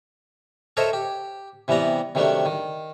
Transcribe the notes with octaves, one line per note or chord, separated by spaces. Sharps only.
A4 A#4 C5 C#5 D#5 E5
G4
C3 E3 G3 B3 A#5
C3 D#3 F#3 G3 A3 D4
D#3